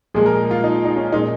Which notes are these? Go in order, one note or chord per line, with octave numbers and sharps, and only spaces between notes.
A#2 F3 G#3 G#4
A#4
F4
D#4
D#4
C#4
A#2 G#3 D#4